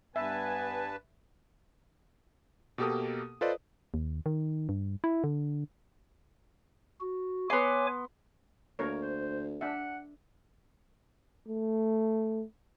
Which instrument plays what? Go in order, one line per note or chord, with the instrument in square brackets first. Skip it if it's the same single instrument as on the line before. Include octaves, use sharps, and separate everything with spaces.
[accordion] G2 B4 A5 [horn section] B3 G#5 [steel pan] E5
[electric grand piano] B2 A#3 G4 A4 A#4 D#6
F4 A4 B4 C5 D5 D#5
[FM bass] D#2
D#3
G2
E4
D3
[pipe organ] F#4
[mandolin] B3 C6 [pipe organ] C#5 G#5 D6
[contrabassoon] D2 [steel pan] A#3 A#4 C#5
[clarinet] C5
[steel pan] D4 E5 [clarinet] F#5
[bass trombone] A3